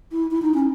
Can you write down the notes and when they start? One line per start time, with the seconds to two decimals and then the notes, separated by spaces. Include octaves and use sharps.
0.12 E4
0.31 E4
0.42 D#4
0.54 C#4